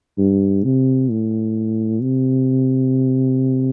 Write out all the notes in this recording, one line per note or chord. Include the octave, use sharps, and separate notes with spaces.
G2
C3
A2
C3